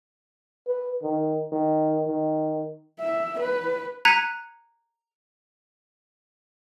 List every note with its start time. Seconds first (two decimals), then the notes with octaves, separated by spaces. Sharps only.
0.68 B4
1.03 D#3
1.52 D#3
2.07 D#3
2.99 E5
3.40 B4
4.05 A#5 F#6 G#6 B6 C#7 D#7